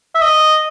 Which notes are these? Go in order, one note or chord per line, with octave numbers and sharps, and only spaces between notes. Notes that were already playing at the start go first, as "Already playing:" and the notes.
E5
D#5